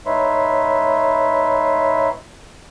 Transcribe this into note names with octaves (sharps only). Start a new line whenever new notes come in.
A2 D#4 B4 C#5 E5 C6